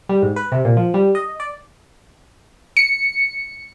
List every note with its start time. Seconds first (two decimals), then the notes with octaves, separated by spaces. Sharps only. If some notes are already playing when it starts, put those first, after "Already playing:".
0.09 G3
0.22 G#2
0.36 B4
0.52 C3
0.65 A#2
0.77 F3
0.94 G3
1.15 D#5
1.40 D5
2.77 C#7